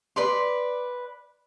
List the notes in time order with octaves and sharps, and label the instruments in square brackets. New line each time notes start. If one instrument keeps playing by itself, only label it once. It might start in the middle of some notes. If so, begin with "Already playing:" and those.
[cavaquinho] B4 D5 C6